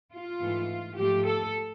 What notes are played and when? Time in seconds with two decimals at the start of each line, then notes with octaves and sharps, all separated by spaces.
0.12 F4
0.40 G#2 E3 A3
0.98 G#2 F3 A3 G4
1.26 A4